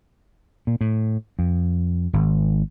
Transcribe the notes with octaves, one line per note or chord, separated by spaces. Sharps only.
A#2
A2
F2
G#1